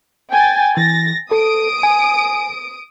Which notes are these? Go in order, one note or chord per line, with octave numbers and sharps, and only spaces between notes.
G5 G#5 A6
E3 A6 A#6
A4 D#6 D7
G#5